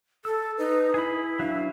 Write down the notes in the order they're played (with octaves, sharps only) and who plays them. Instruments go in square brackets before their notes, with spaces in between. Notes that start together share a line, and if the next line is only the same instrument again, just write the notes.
[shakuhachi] A4 [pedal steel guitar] E6
[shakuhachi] D#4 [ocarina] B4
[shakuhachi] E4 [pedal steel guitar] G#4 B5
[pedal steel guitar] F#3 E5 F5 [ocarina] D4